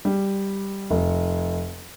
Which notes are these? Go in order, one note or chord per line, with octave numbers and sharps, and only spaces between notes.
G3
F1